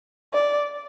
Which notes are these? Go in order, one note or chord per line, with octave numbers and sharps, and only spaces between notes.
D5